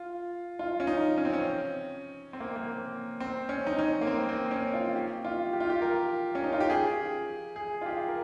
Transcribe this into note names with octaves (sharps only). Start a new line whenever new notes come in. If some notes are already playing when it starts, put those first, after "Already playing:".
Already playing: F4
F4
C#4
D#4
C#4
C4
C#4
C4
A#3
A#3
C4
C#4
D#4
C#4
A#3
C4
C4
C#4
F4
G4
F4
G4
F4
G4
A#4
C#4
D#4
F4
G4
G#4
G#4
F4
G4
A#4